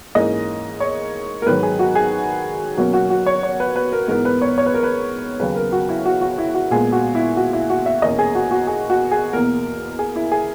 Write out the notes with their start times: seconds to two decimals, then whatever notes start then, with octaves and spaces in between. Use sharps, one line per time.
0.15 G#2 E3 A#3 C#4 D#5
0.80 C#5
1.42 A#4
1.46 G#2 D#3 F#3 B4
1.63 G#4
1.79 F#4
1.95 G#4
2.77 B2 F#3 A#3 C#4 F#4
2.94 F#4
3.10 F#4
3.26 C#5
3.43 C#5
3.60 B4
3.76 B4
3.92 A#4
4.08 G#2 E3 B3 A#4
4.25 B4
4.42 C#5
4.58 C#5
4.66 B4
4.74 A#4
4.83 B4
5.39 D#2 C#3 F#3 B4
5.56 A#4
5.72 F#4
5.89 E4
6.06 F#4
6.21 F#4
6.38 E4
6.55 F#4
6.71 A#2 G#3 B3 G#4
6.92 F#4
7.15 E4
7.37 F#4
7.53 E4
7.70 F#4
7.86 E5
8.02 E2 B2 A#3 C#4 D#5
8.19 G#4
8.35 F#4
8.51 F#4
8.67 G#4
8.90 F#4
9.11 G#4
9.33 E2 B2 A#3 A#4
9.99 G#4
10.16 E4
10.32 G#4